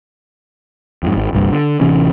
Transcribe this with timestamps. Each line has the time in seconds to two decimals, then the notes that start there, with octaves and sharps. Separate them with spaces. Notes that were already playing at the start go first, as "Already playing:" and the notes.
1.03 F2 G#2
1.16 G#1
1.33 G1 C2 G2
1.52 D3
1.81 A1 C3 E3 C#4